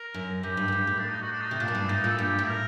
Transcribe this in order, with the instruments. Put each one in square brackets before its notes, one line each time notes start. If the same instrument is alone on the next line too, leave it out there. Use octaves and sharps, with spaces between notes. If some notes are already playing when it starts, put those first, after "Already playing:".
Already playing: [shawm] A#4
[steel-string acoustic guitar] F#2
[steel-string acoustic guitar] F#2 [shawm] G4
[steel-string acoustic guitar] G2
F#2
G2
A2
[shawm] D4
D#4
F#4
D4
D#4
[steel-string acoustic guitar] C3
[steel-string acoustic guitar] A#2 [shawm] D4
[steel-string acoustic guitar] F#2
G2
[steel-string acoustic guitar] A2 [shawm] D#4
[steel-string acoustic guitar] A#2 [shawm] A4
[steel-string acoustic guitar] G2 [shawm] G4
[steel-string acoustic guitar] A2
[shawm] A#4